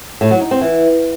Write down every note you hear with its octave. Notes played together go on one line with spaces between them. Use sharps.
A2
F#3
D#4
C4
E3